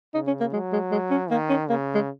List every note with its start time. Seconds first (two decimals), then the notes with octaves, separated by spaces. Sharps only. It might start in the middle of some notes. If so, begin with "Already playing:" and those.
0.14 C#3 D#4
0.27 C#4
0.40 A#3
0.53 F#3 G#3
0.73 G#3
0.91 G#3
1.11 C#4
1.30 D#3 A#3
1.49 C#4
1.69 C#3 A#3
1.95 G#3